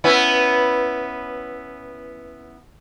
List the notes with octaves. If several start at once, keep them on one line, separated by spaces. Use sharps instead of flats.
B3 C#4 E4